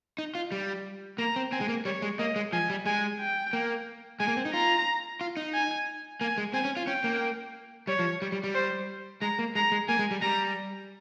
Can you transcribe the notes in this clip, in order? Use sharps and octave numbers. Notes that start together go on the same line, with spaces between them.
D#4
F4
G3
A#3 A#5
C4
C4 G#5
G#3
A#3
G3 C#5
G#3
A#3 D#5
G#3
F3 G#5
G3
G#3 G#5
G5
A#3
G#3 G#5
A#3
C4
D#4
F4 A#5
F4
D#4
G#5
A#3 G#5
G#3
C4 G#5
C#4
F4
C#4 G5
A#3
G3 C#5
F3
G3
G3
G3
C5
G#3 A#5
A#3
G#3 A#5
G#3
A#3 G#5
G#3
G3
G3 A#5